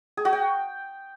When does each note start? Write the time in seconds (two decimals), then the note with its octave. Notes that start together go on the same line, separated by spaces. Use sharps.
0.17 G#4
0.25 F#4
0.33 G5